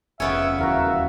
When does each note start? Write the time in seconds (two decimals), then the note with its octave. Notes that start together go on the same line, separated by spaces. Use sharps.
0.20 F1 C#3 B3 C#4 E5
0.59 D#1 E2 F#4 A#4 E5 F5